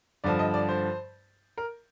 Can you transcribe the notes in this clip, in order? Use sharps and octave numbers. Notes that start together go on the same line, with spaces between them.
G2 D3 F3 D5
D#5
D5
C5
A#4